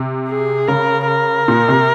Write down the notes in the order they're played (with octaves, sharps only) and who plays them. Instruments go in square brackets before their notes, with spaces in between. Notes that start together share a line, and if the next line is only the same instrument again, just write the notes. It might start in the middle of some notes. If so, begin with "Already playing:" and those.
Already playing: [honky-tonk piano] C3
[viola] G#4
[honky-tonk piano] C#3 [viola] A#4
[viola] A#4
[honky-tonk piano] A#2
C3